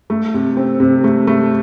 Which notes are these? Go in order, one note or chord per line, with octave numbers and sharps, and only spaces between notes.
A3
C3
C4
C3
A3
A3